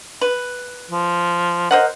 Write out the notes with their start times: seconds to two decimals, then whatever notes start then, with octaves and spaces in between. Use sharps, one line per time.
0.21 B4
0.91 F3
1.71 A#4 C5 D#5 F#5